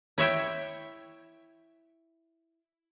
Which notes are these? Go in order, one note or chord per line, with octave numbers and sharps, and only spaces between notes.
E4 C#5 E5 G5